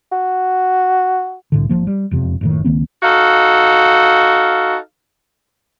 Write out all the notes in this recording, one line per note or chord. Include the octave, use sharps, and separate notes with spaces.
F#4
C2 A2 D3
G#1 D2 F3 A#3
G3
E1 F2 C3
F#1 A2 D#3
C#2 D#3 A#3 C4
D#4 F#4 A4 F5